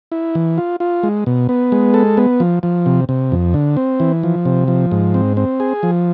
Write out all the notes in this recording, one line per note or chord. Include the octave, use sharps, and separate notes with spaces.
E4
E3
F4
F4
G#3
B2
B3
G#3
A4
B3
F3
F3
C3
C3
F2
D3
C4
E3
F3
C3
F3
G#2
C4
C4
G#4
F3